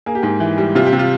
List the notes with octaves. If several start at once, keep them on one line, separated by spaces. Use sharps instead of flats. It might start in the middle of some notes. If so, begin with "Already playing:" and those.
A#3 G#4
G4
G#2 G#4
E3
G3
C3 F4
G4
C3
F4